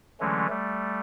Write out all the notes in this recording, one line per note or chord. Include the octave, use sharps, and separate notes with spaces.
D3 E3 F#3 G#3 A3 C#4
G3 A3